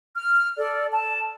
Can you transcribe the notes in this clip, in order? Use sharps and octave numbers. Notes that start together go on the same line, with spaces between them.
F6
A4 D5
A5